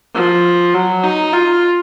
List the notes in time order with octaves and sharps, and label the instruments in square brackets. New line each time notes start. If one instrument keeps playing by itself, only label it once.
[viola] F3
F#3
D#4
F4